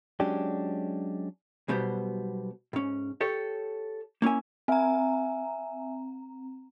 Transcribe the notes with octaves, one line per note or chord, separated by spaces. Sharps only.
F#3 G#3 C#4 D4 G4
B1 B2 G3 B3 C5
G#2 C#4
G4 A4 C#5
A#3 C#4 E4 G#5
C4 E5 G#5 A#5